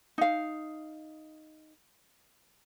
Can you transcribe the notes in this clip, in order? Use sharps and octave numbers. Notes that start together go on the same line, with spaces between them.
D#4 F5